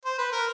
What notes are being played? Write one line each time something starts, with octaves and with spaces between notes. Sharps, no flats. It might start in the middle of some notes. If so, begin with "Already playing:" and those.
C5
B4
A#4